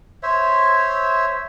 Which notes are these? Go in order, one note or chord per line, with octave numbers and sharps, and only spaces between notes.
C5 C#5 E5